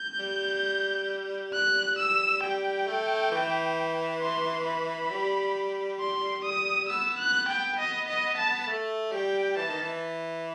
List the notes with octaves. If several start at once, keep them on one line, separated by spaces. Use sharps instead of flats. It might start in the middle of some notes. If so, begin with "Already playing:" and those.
Already playing: G6
G3
F#6
E6
G3 G5
A3
E3
C6
B5
G3
C6
D#6
B3 E6
F#6
G5
D#5
D#5
A5
A3
G3 G5
E3 A5
D#3
E3